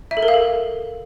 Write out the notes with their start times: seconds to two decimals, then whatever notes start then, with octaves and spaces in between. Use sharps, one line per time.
0.11 E5
0.17 A4
0.23 A#4
0.28 F5
0.34 A4